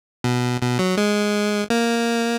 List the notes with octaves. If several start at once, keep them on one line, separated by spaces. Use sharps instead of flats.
B2
B2
F#3
G#3
A#3